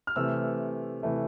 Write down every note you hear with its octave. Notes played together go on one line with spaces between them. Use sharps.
F6
C3 E3 A3 E6
C3 E3 A3